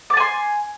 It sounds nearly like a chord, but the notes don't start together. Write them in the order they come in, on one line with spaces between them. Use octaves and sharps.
D6 A5 G#5 C6